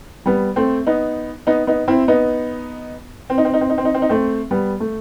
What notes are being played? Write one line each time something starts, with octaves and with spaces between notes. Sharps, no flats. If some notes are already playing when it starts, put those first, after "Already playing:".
G3 B3
A3 C4
B3 D#4
B3 D#4
B3 D#4
C4 E4
B3 D#4
C4
D#4
C4
D#4
C4
D#4
C4
D#4
C4
D#4
A3 C4
G3 B3
A3